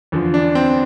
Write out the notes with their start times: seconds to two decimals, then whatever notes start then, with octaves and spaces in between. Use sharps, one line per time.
0.12 E2 D3 F3
0.34 D4
0.55 C4